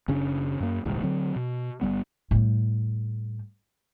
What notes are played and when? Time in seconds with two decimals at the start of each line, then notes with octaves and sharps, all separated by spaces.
0.08 F#1 C#3 C#4 D4
0.60 F#2 A#3
0.85 D#1 C2 G#2
1.03 D3 F#3 C4
1.36 B2
1.81 G1 G2 G3 B3
2.31 A2 G3